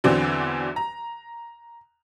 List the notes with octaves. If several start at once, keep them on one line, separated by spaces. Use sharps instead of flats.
E2 D3 E3 F#3 C4 D4
A#5